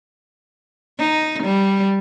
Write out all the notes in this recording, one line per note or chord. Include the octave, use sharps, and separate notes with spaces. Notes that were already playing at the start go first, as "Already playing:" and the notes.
D#4
G3